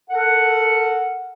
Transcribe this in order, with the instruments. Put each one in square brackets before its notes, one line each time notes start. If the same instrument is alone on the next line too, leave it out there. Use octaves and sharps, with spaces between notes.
[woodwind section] A4 A#4 F#5